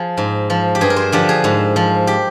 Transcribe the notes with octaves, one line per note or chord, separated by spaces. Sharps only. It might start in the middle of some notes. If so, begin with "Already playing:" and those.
Already playing: F3 G#4
G#2
F3
G4
G2 G#4
A#4
C5
D3 F3 G4
G#4
G#2
F3
G4